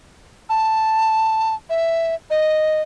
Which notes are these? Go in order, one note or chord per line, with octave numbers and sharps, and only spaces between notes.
A5
E5
D#5